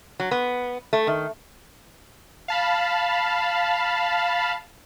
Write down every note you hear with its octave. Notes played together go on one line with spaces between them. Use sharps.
F#3
B3
A3
D#3
F5 A5 B5